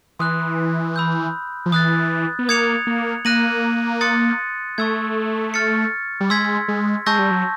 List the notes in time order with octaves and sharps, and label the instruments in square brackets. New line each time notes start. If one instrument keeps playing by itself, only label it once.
[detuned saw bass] E3 [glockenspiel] C6 D#6 F#6
[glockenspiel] B5 E6 G6
[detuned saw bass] F3
[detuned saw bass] E3 [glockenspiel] D#6 F#6 A6
[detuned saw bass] B3
[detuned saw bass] A#3 [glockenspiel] D#6 G#6 C#7 F7
[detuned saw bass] A#3
[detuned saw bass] A#3 [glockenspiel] F#6 A#6 D#7 F#7
[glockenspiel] C6 D#6 F#6 A6 C#7
[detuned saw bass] A3 [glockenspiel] C#6 E6 G#6
[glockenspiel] F6 A6 C#7
[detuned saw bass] G3
[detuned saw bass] G#3 [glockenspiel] C6 E6 G#6 B6
[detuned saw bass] G#3
[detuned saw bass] G#3 [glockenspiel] A5 C#6 E6 G6 A#6
[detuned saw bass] G3
F#3